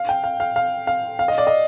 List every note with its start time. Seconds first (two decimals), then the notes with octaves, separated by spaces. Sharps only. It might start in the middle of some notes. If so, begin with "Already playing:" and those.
Already playing: F5
0.09 G5
0.24 F5
0.40 F5
0.56 F5
0.87 F5
1.19 F5
1.28 D#5
1.38 D5
1.47 D#5